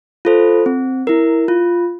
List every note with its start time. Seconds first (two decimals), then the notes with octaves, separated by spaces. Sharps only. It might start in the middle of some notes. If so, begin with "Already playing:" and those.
0.25 F4 A4 C5
0.66 C4
1.07 E4 A#4
1.48 F4